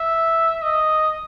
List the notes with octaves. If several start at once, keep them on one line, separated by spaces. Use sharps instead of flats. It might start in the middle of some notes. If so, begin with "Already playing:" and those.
Already playing: E5
D#5